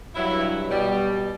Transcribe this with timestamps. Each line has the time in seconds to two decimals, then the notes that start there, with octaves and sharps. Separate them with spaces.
0.15 G2 F#3 E4
0.66 B2 G3